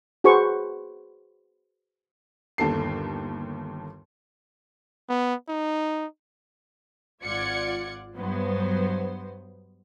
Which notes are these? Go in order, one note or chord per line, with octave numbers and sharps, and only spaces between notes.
F#4 G#4 B4 C5 C#6
G1 D#2 A4 C7
B3
D#4
G#1 F4 D5 F#5 G#6 C#7
G2 F#3 B3 C5